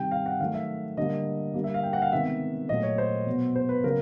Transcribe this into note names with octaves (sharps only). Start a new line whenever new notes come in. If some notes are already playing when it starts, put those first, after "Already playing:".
Already playing: C3 D#3 G3 G5
F5
F#5
D#3 F#3 A3 F5
E5
D3 G3 A#3 D#5
D3 G3 A#3
E5
F5
G5
F#5
F5
C3 D#3 G#3 B3 E5
A#2 F#3 A3 D#5
C#5
C5
B2 F#3 B3
C5
B4
C#3 F#3 A#3 A#4